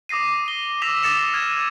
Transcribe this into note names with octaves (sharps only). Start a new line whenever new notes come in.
D6 D#6 A#6 C7 D#7
D#7 G7
D6 E6 A#6 B6 E7 F7
D6 D#6 A6 C#7 E7
F6 G#6 D#7 E7